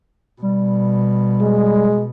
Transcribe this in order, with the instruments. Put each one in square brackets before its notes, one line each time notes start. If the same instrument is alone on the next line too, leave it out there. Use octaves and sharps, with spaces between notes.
[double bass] B2 [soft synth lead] G3
[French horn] G#3